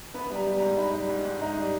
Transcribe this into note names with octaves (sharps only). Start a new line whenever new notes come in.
B3 B5
G3 A#5
G3
A#5
G#2
D#4 B5
G3
G#2
G#2
D#4 A#5
G3